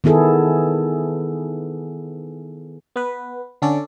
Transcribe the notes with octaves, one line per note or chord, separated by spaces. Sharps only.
D#3 B3 E4 G#4 A4
B3 B4
D3 C#4 A4 D5